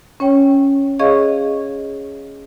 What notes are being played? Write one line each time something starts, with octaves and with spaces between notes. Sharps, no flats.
C#4 C#5 G5
G#4 C#5 D#5 F5 C#6